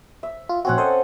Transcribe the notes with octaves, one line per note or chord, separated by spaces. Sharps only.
E5
F4
A#1 C4 C#4 F#4 F#5
A4 C5 D#5